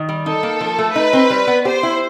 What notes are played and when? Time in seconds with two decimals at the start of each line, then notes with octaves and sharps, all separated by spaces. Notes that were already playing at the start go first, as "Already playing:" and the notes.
Already playing: D#3
0.09 G3
0.26 D#4 A4
0.43 A#3
0.61 F3
0.79 A3
0.95 D#4 B4
1.13 C4
1.30 G3
1.47 B3
1.65 G4 C5
1.83 E4